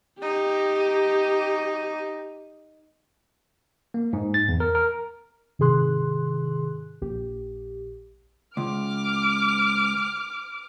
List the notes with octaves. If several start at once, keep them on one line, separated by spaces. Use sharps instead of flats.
D#4 G4
A#3
G#2
A6
E2
A#4
A#4
G#2 C3 D#3 G#4 C6 F#6
A#1 G4
C#2 D6 F6